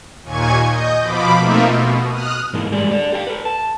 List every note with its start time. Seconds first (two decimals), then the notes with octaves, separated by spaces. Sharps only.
0.24 D#2 A#2 G#5 C#6 G#6
0.67 D#5 G6
1.01 B2 F3 B5 D6
1.39 A3 A#3 C4 D#4 F4 E5
1.69 B2
2.09 D#6 F6 F#6
2.54 G#2 E3 G#3 A#3
2.72 G2 G#3 G4 G#4 D5
2.91 A4 D5
3.12 G4 F5 G5
3.27 A4 B4
3.45 A5